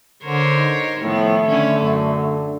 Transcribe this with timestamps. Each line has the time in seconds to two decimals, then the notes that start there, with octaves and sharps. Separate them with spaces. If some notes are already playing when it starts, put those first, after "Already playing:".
0.25 D3 A#4 C5 C#5
0.54 D#4
1.01 A2 D#3 F3 A3 B3
1.48 D3 C#4 E4 B4
1.83 F#2